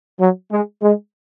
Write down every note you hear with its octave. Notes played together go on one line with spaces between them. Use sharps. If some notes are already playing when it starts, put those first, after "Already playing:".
F#3
G#3
G#3